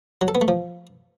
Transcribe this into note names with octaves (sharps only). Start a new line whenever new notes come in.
F#3
A4
B3
A3
F3